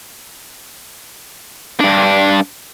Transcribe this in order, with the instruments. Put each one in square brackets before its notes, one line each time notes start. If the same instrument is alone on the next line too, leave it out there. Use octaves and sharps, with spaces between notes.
[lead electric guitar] G2 D4